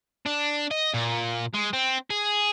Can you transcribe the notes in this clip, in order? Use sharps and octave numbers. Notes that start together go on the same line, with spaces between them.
D4
D#5
A#2
G#3
C4
G#4